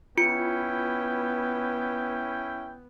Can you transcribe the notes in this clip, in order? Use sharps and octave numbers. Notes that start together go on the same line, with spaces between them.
B3 C#4 E4 F4 G5 C#7